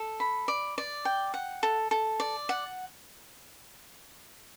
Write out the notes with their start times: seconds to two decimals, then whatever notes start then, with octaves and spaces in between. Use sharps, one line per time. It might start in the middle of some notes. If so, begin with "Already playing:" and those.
Already playing: A4
0.20 B5
0.48 D5
0.78 D5
1.05 G5
1.34 F#5
1.63 A4
1.91 A4
2.20 D5
2.49 F#5